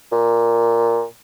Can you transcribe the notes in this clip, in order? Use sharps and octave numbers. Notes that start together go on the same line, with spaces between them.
A#2